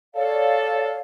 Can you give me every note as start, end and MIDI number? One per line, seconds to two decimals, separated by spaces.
0.15 1.00 69
0.15 0.99 73
0.15 0.99 74
0.15 0.99 77